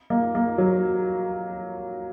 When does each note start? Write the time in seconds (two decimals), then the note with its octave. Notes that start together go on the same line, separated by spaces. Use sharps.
0.10 A#3
0.35 A#3
0.58 F#3